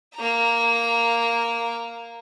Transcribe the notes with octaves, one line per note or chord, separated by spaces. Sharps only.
A#3 A#5